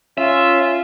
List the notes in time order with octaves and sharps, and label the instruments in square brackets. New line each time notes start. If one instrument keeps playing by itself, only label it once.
[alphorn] C#4 [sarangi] F4 [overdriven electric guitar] E5